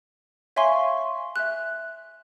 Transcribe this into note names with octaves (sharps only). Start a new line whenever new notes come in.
C#5 E5 F5 G#5 C6 C#6
E5 F#6